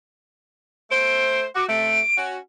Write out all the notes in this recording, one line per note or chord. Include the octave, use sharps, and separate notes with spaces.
A3 C5 D7
F#4 D6
C3 A3 D7
C#4 F#4